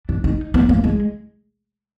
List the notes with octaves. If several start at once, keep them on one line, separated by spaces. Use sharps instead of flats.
D4
D#4
B3
A#3
G#3